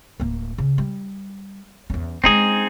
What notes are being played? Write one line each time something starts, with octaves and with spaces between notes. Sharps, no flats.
D1 A#3
C#3
G3
E2 C#4
G#3 C4 C#4 D#4 G#4